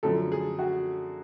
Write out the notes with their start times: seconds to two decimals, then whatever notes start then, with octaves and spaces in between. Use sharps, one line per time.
0.03 F#2 D3 F3 A4
0.32 G#4
0.59 F#4